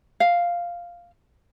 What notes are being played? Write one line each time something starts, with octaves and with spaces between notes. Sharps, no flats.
F5